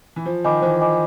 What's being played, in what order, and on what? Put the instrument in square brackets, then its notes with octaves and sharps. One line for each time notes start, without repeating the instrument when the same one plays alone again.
[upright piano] E3
[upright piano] F3 [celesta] C5
[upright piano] D#3 [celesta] D#5 G#5 B5 D6
[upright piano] E3 [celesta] C5
[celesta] D#5 G#5 B5 D6